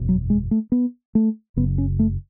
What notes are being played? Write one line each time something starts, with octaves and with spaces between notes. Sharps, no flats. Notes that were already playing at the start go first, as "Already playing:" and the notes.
Already playing: F#1 E2 B2
F#3
G#3
A3
B3
A3
F#1 F#2 C#3 B3
C#4
A3